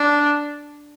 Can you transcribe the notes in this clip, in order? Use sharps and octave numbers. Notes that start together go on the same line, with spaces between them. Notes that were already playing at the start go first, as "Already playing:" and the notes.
Already playing: D4